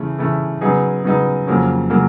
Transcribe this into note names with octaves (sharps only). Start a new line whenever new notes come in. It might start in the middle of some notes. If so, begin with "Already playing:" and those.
Already playing: C#3 E3 A3
C#3 E3 A3
C#3 F#3 B3 D#4 G#4
C#3 F#3 B3 D#4 G#4
F2 C#3 F#3 A#3 C#4
C#3 F#3 A#3 C#4